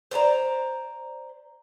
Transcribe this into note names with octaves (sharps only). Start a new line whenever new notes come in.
C5 D5 G#5 A#5